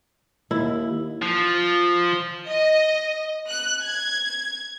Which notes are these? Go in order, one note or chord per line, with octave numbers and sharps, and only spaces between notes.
D#2 E4
F3
D#5
F#6
G#6